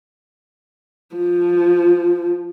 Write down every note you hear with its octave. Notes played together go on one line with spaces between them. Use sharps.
F3